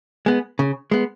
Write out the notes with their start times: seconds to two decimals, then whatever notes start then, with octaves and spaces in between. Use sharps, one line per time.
0.26 G#3 B3
0.59 C#3
0.91 G#3 B3